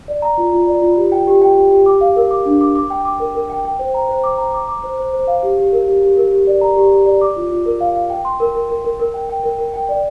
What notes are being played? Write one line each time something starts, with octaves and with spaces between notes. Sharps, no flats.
D5
A#5
F4
F4
D5
F4
G4
G5
G4
G5
G4
G4
D6
F5
A#4
D6
D4
D6
D6
G5
D6
A#4
A#4
G5
G5
C5
A#5
C5
D6
A#5
D6
D6
C5
C5
C5
F5
G4
G4
A#4
G4
G4
A#4
G4
D5
A#5
G4
G4
D5
D6
F4
F4
A#4
F5
F5
G5
C6
A#4
A#4
A#4
A#4
A#4
G5
G5
A#4
A#4
G5
D5